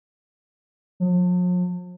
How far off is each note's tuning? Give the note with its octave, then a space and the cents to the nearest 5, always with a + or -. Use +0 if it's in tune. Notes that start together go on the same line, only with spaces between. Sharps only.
F3 +45